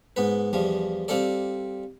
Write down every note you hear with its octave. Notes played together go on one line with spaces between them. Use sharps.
G#2 B3 B4
E2 F3 G3
G3 C4 F4 A4 D5